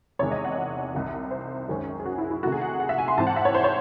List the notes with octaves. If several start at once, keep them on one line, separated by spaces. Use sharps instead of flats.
E2 C3 D#3 G#3 C#5
D#5
F#5
D#5
C2 C3 D#3
C5
F#2 D#3 G#3 C#4
G#4
F#4
E4
E4
C3 D#3 A3 F#4
G#4
F#5
F#5
E5
G#5
C6
G#2 E3 C4 A5
F#5
E5
C#5
C5
C#5